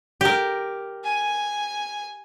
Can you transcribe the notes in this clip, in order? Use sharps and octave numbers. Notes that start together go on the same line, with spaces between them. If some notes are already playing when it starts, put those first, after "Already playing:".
G4 A#4
G#5